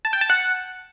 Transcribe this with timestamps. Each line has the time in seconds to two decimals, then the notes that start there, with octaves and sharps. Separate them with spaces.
0.05 A5
0.13 G5
0.21 A5
0.30 F#5